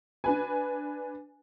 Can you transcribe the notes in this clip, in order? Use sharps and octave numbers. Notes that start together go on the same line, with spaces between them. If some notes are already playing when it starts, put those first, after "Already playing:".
D4 B4 G#5